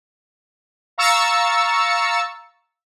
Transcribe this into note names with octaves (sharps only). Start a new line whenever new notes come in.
F5 A#5 C#6 E6 A6 C#7